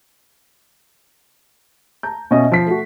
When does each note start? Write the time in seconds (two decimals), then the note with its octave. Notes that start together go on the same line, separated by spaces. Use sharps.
2.03 A5 A#5 G6
2.31 B2 C#4 D#5 E5 C#6
2.52 F3 B6 C7
2.67 A3 F#4